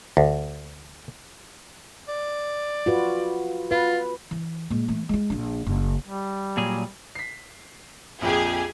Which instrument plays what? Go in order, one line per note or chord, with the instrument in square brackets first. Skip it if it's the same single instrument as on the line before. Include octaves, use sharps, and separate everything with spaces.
[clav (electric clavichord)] D2
[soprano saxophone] D5
[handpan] F4 F#4 B4
[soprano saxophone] F4 [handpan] B4
[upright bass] E3
A#2 G#3
E3 A3
G#3 E4
A#1 D4
F#1
[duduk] G3
[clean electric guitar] A#2 F#3 G#4
[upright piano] B6 C7
[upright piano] A#1 F2 G5 [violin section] G4 G#4 G#5